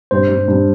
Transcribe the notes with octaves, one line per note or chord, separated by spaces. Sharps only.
G2 C5
G2
G2